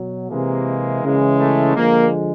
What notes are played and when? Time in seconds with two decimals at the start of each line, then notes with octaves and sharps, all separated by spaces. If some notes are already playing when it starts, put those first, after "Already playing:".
Already playing: B2 F#3
0.30 C3 E3 G#3 A#3
1.03 C#3 E3 G#3
1.39 A3
1.75 D3 F3 G#3 A#3